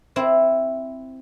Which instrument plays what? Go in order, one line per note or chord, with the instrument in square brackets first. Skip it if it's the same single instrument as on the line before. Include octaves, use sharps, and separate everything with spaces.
[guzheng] C4 E4